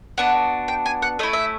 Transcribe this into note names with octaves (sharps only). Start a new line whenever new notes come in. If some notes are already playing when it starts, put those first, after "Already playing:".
B3 D4 F#4 F#5
G5
G#5
F#5
A3 C#4 E4 D#5
E5